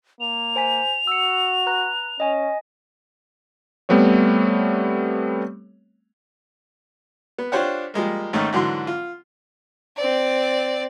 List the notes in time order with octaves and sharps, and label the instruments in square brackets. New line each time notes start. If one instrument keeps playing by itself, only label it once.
[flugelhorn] A#3 [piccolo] F7
[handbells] C5 G#5 B6
[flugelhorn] F#4 [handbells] E6 C#7
[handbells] B4 A#5 F#6
[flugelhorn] C#4 [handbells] D#5 G#5
[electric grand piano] G3 A3 B3 C4 C#5
[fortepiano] B3
D4 F4 G4 C5 C#5 F#5
F3 G3 G#3 A#3
G#2 D#3 A3 A#3 C#4 D#4
G#2 D3 E3 F#3 C6
F4
[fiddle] C4 D5